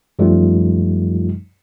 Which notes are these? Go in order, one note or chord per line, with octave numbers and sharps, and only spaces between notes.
F#2 F3 G3 A3 D#4 F4